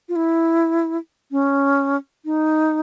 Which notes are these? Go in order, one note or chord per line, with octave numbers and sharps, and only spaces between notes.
F4
E4
C#4
D#4